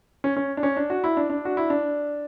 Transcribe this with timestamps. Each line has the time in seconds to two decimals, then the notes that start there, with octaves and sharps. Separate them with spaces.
0.24 C#4
0.36 C#4
0.57 D4
0.63 C#4
0.77 D4
0.90 F#4
1.04 E4
1.17 D4
1.30 D4
1.45 F#4
1.57 E4
1.70 D4